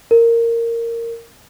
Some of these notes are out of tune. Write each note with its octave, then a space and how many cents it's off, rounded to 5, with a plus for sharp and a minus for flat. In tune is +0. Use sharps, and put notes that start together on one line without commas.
A#4 -10